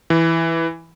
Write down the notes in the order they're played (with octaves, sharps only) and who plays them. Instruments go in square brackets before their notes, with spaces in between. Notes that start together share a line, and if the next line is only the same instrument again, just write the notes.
[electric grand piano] E3